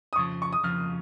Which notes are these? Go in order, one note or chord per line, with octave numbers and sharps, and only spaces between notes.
D#6
F2 C#3 F3 C#6
C#6
D#6
F2 C#3 F3 F6